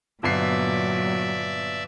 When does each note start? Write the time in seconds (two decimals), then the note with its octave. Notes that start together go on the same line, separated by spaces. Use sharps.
0.23 G1 A#2 F#3 B3 D5 E5 C7